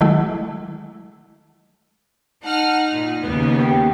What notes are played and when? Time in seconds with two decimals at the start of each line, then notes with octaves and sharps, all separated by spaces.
0.01 D#3 F#3 G#3 A3 E4
2.44 D#4 F#5 A5 F6
2.91 A#2
3.24 D#2 C#3 B3
3.59 G4 D#6